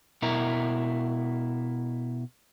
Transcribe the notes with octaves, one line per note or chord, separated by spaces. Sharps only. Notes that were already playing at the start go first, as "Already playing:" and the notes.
B2 E4 A#4